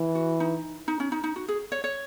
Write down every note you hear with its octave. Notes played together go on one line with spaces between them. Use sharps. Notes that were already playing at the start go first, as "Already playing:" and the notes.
Already playing: E3
F#4
D#4
D#4
C#4
D#4
D#4
F#4
G#4
C#5
C#5